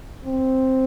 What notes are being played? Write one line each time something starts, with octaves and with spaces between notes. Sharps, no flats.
C4